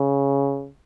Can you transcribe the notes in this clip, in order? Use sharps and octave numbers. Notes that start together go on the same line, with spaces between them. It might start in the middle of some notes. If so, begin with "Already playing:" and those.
Already playing: C#3